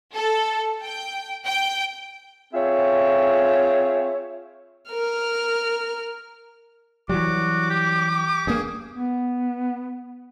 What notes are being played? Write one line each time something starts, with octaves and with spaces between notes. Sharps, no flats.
A4
G5
G5
C4 F4 G#4 C#5 E5
A#4 F6
E3 F#3 G3 F#4 D6
G4
G4
G2 A#3 G#4
B3